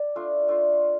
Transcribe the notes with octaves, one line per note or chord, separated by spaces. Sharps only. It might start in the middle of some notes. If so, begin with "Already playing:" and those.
Already playing: D5
A3 D4 F4
A3 D4 F4